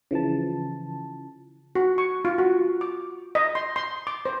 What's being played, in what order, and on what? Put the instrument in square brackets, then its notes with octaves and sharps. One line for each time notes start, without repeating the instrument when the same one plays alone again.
[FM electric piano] C#3 E3 F3 A5
[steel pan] F#4
C#6
F4
F#4
D6
D#5
C6
C6
D6
C5